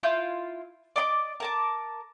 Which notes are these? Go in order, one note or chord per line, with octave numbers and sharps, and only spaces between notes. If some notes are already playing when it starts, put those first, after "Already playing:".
E4 F4 G6
D5 D#5 C6 D6
A#4 A5 D6